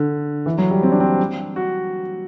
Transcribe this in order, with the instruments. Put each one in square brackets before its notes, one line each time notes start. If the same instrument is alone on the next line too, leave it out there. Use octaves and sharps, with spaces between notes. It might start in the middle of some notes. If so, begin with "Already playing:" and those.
Already playing: [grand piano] D3
E3
F#3
G3
C4
D4
C4
F#4